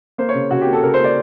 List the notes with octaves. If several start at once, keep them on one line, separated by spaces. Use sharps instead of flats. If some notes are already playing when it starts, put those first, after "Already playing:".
A#3 C5
C#5
C#3
C#3 F#4
G4
A#3
A4
C#3 A#4
C5
A#3
D5